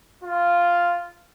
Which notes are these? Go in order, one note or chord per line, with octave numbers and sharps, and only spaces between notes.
F4